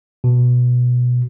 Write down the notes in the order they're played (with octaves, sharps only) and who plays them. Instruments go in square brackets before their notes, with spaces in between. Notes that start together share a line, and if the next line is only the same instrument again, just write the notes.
[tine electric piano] B2